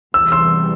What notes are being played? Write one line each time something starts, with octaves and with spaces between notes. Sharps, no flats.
E2 C3 E3 G3 E6
C6 E6